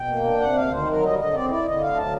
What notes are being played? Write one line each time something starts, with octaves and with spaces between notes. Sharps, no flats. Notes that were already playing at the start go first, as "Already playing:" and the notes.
Already playing: B2 G5
A#3
D4
C3 F#5
D2 F5
D#3 C5
F#3 A#4
G3 D#5
D3 D#5
C4 D5
E4 D5
D3 D#5
D2 F5
F#3 A5